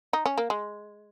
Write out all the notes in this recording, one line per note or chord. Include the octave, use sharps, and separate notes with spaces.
D#4
C#4
A#3
G#3